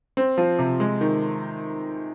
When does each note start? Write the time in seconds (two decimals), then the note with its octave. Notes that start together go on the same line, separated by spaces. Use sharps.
0.17 C4
0.38 F3
0.59 C3
0.80 G#3
1.01 D#3